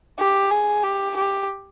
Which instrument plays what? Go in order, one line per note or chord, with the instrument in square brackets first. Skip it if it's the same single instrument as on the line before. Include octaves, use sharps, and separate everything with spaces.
[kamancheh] G4
G#4
G4
G4